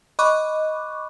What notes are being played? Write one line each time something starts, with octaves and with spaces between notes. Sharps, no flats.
D#5 B5 C#6 D6 F#6